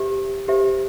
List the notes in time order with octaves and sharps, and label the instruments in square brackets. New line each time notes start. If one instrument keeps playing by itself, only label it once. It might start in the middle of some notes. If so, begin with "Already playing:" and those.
Already playing: [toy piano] G4 C5 E5
G4 C5 E5